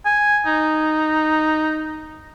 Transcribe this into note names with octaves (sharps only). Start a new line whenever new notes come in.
G#5
D#4